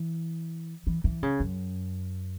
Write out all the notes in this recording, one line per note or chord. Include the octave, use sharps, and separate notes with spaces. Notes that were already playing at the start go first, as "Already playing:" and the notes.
Already playing: E3
E3
E3
C#3
F#2